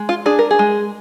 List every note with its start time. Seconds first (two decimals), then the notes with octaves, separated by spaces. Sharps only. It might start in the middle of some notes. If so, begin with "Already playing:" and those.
Already playing: G#3
0.09 F4
0.26 D4 G#4
0.39 A#4
0.51 G#4
0.59 G#3